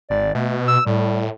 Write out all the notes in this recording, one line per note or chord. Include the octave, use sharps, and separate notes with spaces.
G#1 D5
B2 A3
E6
A2 G3